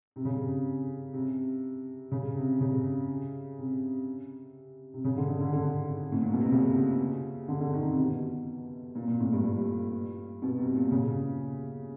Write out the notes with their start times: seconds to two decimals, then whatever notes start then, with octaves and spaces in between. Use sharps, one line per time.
0.16 C3
0.25 C#3
0.34 C3
1.14 C3
2.12 C#3
2.36 C3
2.60 C#3
3.58 C3
4.94 C3
5.04 C#3
5.17 D3
5.30 D3
5.41 D3
5.53 D3
6.12 A2
6.21 A#2
6.32 B2
6.41 C3
6.52 C#3
7.48 D3
7.60 D3
7.74 D#3
7.85 C3
7.98 B2
8.95 A#2
9.08 A#2
9.20 A2
9.33 G2
9.44 G2
10.42 B2
10.58 C3
10.75 A#2
10.91 C#3